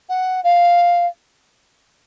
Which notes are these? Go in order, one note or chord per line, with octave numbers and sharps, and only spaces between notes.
F#5
F5